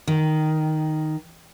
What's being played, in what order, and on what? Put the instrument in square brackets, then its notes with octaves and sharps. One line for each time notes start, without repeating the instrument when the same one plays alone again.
[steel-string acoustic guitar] D#3